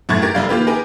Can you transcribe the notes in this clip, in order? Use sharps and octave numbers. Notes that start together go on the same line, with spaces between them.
F#2 A2 F#5 C#6 G#6 A6
G4 A#4
F1 G3 F5
D#3 A#3 F4 G4 B4
G4 G#4 A#4 B4